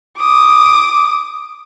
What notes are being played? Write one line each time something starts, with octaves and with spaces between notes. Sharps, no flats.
D6 D#6